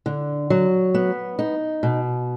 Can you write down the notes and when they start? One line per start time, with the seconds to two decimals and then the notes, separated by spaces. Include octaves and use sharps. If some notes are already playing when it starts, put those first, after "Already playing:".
0.06 D3
0.50 F#3
0.94 B3
1.39 D#4
1.83 B2